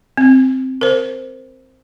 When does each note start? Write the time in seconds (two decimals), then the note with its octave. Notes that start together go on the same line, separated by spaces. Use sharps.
0.17 C4
0.81 A#4 C5